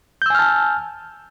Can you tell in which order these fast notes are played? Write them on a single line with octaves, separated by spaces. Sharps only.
G6 E6 G#5 F6 A5